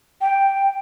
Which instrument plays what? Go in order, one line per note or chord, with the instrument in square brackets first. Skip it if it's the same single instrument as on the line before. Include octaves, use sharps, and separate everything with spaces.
[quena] G5